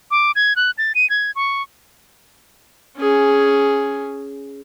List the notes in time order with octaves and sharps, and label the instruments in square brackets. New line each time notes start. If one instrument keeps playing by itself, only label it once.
[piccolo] D6
G#6
F#6
A6
D#7
G#6
C#6
[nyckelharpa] C#4 G#4